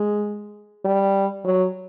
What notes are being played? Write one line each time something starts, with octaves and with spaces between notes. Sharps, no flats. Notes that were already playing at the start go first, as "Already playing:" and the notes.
Already playing: G#3
G3
F#3